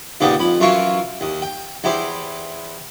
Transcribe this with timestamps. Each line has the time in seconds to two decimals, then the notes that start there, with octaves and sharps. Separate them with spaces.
0.21 D#2 A#2 C#3 B3 D5 G5
0.39 F2 B5
0.60 F#2 E3 F4 E5 C6 C#6
1.21 D#2
1.42 G5
1.84 E2 E4 G4 C5